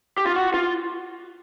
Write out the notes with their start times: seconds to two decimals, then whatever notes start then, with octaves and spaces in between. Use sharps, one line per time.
0.18 G4
0.26 F4
0.36 F#4
0.54 F4